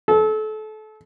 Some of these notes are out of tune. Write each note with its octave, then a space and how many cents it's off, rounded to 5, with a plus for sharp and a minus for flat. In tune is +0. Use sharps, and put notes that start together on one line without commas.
A4 -30